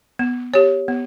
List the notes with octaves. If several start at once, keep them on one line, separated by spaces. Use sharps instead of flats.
B3
G4 C#5
B3